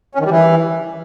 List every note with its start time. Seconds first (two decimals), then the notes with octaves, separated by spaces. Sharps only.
0.15 C#4
0.20 D#3
0.25 G3
0.31 E3